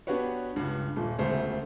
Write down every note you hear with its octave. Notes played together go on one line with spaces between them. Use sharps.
B3 D4 F#4 G4 B4 C#5
C#2 G2
D#1 A#2
E1 D2 C#3 A3 C5